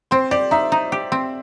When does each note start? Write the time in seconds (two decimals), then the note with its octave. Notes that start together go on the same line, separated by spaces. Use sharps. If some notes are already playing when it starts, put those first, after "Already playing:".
0.11 C4 C5
0.31 G4 D5
0.51 D#4 E5
0.72 D#4
0.92 G4
1.12 C4